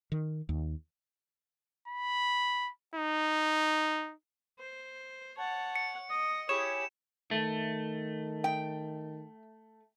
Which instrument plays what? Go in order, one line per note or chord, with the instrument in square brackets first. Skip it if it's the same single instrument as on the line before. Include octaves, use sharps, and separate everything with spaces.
[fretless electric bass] D#3
D#2
[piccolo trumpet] B5
D#4
[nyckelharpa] C5
[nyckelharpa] C#5 F#5 [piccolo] A5
[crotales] C#7
[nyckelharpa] D#5 [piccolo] D#6
[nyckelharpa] E4 G4 [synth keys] G#4 C#5 [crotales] E7
[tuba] D#3 [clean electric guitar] A3
[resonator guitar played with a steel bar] G5